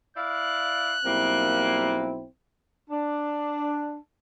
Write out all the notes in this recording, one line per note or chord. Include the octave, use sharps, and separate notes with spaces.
E4 D5 F5 F#6
B1 G3 A#3 C4 E4
D4